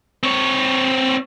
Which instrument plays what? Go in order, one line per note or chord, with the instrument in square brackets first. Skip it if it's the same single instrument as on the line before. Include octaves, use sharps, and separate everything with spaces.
[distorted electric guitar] C4 C#5